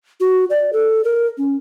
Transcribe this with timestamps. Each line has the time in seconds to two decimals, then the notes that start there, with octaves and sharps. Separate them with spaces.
0.20 F#4
0.50 D5
0.73 A4
1.04 A#4
1.38 C#4